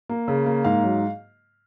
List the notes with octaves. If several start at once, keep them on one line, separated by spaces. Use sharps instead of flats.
A#3
C#3
A#3
G#2 F5
F#3